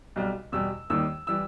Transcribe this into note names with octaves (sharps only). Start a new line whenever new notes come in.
B1 B2 G3
E2 B2 G3 E6
D#2 D#3 G3 E6
E3 G3 E6